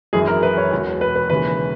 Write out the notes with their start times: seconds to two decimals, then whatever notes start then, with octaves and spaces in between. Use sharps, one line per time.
0.13 G#1 F#2 E3 G#4
0.27 A#4
0.43 B4
0.58 C#5
0.72 E1 E2 B2 F#3
1.01 B4
1.15 B4
1.30 E1 D#2 C#3 E3 B4